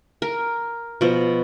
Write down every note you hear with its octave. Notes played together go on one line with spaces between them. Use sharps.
A#4
B2 F3